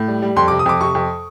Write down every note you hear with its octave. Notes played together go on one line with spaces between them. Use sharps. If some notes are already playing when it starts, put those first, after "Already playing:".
Already playing: A2
G3
G3
F2 C6
D6
C3
D#6
F2 D6
C3 C#6
F2